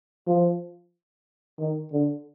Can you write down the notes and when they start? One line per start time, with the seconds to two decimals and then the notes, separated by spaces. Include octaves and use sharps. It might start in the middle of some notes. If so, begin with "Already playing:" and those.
0.27 F3
1.59 D#3
1.92 D3